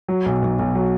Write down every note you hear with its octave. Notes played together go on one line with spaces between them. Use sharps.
F#3
B1
B1
B1
F#3